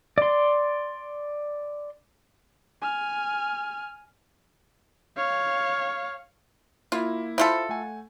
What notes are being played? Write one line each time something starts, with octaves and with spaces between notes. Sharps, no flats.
D5 C6
G#5 F6
C#5 F5
A#3 E4 F4
E4 F4 A4 C5 B5 C6
A3 F#5 G#5